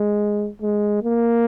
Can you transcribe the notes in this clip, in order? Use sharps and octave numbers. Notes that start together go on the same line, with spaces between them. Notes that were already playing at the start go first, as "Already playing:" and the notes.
Already playing: G#3
G#3
A#3